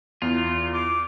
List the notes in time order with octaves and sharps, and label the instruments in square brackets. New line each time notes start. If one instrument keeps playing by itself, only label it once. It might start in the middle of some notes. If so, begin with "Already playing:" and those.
[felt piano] E2 [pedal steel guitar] F4
[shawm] D6